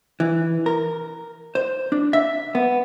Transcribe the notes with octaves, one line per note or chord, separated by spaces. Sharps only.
E3
A#4
C5
D4
E5
B3